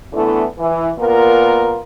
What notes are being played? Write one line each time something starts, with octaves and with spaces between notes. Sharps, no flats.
D3 E3 A3 B3 E4
E3
A#2 B3 F4 A#4